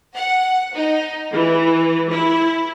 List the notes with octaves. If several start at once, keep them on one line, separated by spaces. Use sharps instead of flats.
F#5
D#4
E3
E4